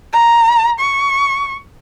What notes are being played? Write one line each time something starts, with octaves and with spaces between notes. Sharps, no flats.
A#5
C#6